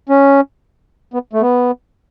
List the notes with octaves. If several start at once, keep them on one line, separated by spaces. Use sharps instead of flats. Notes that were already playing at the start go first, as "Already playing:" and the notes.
C#4
B3
A3
B3